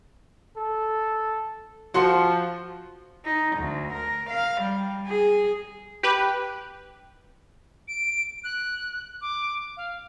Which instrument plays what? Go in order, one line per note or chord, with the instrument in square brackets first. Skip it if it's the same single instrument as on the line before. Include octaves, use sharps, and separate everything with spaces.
[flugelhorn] A4
[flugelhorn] F3 [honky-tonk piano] F#4 C6 C#7
[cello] D#4
D2
A#4
F5
G3
G#4
[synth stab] G4 B4
[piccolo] D7
F#6
D6
F5